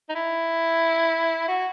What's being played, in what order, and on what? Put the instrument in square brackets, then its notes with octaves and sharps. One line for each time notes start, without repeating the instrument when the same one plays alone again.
[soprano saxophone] D#4
E4
F#4